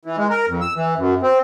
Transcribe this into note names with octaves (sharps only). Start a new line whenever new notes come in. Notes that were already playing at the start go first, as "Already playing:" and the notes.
E3
G#3
A#4
F2
E6
E3
F#2
C4